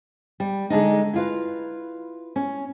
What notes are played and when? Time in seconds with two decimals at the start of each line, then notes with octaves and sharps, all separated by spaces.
0.40 G3
0.70 D3 G#3 D4 D#4
1.13 E4 F4 B4
2.36 C#4